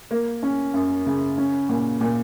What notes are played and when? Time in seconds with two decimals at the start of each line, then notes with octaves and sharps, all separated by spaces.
0.11 A#3
0.43 C#4
0.74 F#2
1.06 C#3
1.38 C#4
1.69 A#2
2.01 A#2